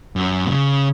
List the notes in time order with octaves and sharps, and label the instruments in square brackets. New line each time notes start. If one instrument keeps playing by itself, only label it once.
[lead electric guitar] F#2
B2
C#3